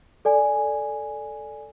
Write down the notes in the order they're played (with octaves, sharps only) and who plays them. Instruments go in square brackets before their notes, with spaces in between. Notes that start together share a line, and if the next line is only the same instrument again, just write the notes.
[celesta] A4 D5 G#5